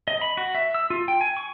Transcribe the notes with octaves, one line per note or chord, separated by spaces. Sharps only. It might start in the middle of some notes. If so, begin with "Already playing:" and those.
D#5
B5
F#4
E5
E6
F4
G5
G#5
C#6